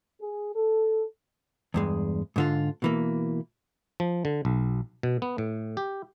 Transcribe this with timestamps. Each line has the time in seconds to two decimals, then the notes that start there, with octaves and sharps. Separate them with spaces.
0.22 G#4
0.56 A4
1.74 E2 G2 G#3
2.36 G#2 D3 F4
2.82 B2 E3 A#3
4.00 F3
4.25 D3
4.45 B1
5.03 B2
5.22 B3
5.38 A2
5.77 G4